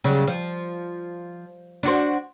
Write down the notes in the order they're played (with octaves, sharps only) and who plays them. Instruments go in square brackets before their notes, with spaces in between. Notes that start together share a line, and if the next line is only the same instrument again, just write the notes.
[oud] C#3 F#3 G3
F3
D4 F#4 C5